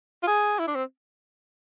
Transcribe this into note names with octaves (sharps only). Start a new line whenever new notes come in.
F4
G#4
E4
D4
C4